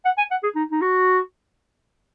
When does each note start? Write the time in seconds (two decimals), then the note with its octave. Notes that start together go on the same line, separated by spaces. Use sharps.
0.05 F#5
0.18 G#5
0.31 F#5
0.43 G#4
0.55 D#4
0.72 D#4
0.81 F#4